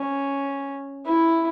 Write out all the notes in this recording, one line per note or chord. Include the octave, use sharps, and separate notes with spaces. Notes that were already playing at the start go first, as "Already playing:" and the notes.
Already playing: C#4
E4